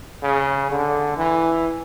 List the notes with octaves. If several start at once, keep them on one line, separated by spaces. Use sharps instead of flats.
C#3
D3
E3